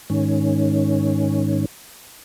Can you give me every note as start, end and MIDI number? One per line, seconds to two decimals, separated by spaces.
0.10 1.65 44
0.10 1.65 51
0.10 1.65 61